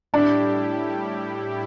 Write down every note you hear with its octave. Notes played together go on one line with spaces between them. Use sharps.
A2 G3 D4 E4 G4